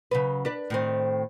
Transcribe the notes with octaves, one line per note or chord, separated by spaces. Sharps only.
C#3 F#3 B4
D4 B4
A2 D#3 C4